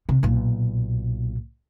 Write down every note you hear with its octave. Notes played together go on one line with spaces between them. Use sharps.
C3
B1 A#2